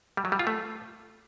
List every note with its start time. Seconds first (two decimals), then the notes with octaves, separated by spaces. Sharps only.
0.17 G3
0.25 F#3
0.32 G3
0.39 F4
0.47 A3